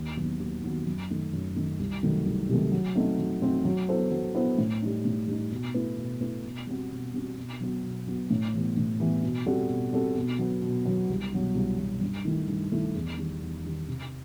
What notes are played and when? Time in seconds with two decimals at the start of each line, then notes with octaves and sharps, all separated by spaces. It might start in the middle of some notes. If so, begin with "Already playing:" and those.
Already playing: D#2
0.17 D#3 F#3 B3 F#4
0.40 D#2
0.64 D#3 F#3 B3 F#4
0.87 F#2
1.10 D#3 A3 D#4
1.33 F#2
1.56 D#3 A3 D#4
1.80 C2
2.03 C3 D#3 F#3 A3
2.26 C2
2.49 C3 D#3 F#3 A3
2.72 F#3
2.95 A3 C4 D#4 F#4
3.19 F#3
3.42 A3 C4 D#4 F#4
3.65 F#3
3.89 B3 E4 A4 C5
4.12 F#3
4.35 B3 E4 A4 C5
4.58 A2
4.82 G3 D#4
5.05 A2
5.27 G3 D#4
5.51 B2
5.74 A3 E4 B4
5.98 B2
6.21 A3 E4 B4
6.44 B2
6.67 G3 C4 F#4
6.91 B2
7.14 G3 C4 F#4
7.37 B2
7.61 F#3 B3 F#4
7.83 B2
8.07 F#3 B3 F#4
8.30 A2
8.53 E3 G3 B3
8.77 A2
9.00 E3 G3 B3
9.23 B2
9.46 G3 C4 F#4 A4
9.69 B2
9.93 G3 C4 F#4 A4
10.16 B2
10.39 F#3 B3
10.62 B2
10.86 F#3 B3
11.09 C2
11.33 B2 F#3
11.55 C2
11.79 B2 F#3
12.01 G2
12.25 D#3 A3 E4
12.48 G2
12.71 D#3 A3 E4
12.95 E2
13.17 D#3 G3
13.41 E2
13.65 D#3 G3
13.88 C3